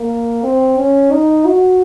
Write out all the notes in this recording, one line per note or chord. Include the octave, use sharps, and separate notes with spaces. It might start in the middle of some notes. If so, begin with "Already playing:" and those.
Already playing: A#3
C4
C#4
D#4
F#4